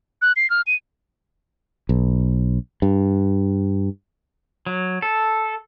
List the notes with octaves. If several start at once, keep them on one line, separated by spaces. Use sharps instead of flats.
F#6
C7
F6
D#7
B1
G2
F#3
A4